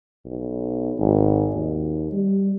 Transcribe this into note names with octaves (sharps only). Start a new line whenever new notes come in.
B1
G#1
D#2
G3